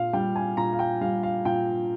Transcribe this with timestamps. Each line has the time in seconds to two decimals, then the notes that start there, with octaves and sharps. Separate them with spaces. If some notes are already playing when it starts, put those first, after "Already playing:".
Already playing: A#2 F5
0.13 G3 G5
0.36 G#5
0.57 A#2 A#5
0.73 F5
0.79 G5
1.01 G3 F5
1.23 F5
1.45 A#2 G5